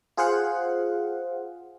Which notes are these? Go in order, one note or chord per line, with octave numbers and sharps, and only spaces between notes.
F4 G#4 C5 F5 F#5